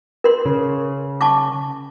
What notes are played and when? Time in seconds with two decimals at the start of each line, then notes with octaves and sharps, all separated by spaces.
0.24 A#4 C6
0.45 C#3
1.21 A5 C#6 D6